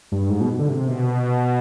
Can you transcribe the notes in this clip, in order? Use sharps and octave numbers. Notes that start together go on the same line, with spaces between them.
G2
G#2
B2
D3
C3
B2